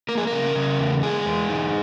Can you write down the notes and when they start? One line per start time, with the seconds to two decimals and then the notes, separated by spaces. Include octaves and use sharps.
0.09 A#3 A#4
0.17 G#4
0.27 A#4
0.32 C#3
0.56 C#3
0.79 E2
1.03 G#3 G#4
1.25 E2
1.49 D#4